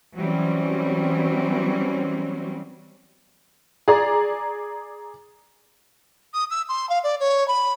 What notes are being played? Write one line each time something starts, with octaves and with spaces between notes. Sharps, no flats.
E3 F#3 G3 C4 C#4
G#4 D5 A#5
D#6
E6
C6
F5
D5
C#5
B5